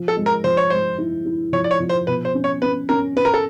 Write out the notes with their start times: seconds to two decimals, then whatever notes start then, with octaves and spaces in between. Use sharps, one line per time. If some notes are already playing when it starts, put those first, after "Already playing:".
Already playing: F3
0.08 A4
0.17 G#3
0.26 A#4
0.44 F3 C5
0.57 C#5
0.70 G#3 C5
0.98 E4
1.25 E4
1.53 F3 C#5
1.64 D5
1.71 C#5
1.80 F3
1.89 C5
2.07 B2 B4
2.25 C5
2.35 C#4
2.44 C#5
2.62 C#4 B4
2.89 C#4 A#4
3.16 C#4 B4
3.25 A#4
3.34 A4